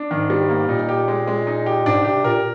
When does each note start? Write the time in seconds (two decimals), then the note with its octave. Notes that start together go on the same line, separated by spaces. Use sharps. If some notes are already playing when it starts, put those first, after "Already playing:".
Already playing: D4
0.11 G#2 D#3
0.30 G3
0.49 A#3
0.69 A#2 D#4
0.89 G4
1.08 G#3
1.27 G#3
1.47 D#4
1.66 G4
1.85 G#2 D4
2.05 C3 G4
2.24 A#2 A#4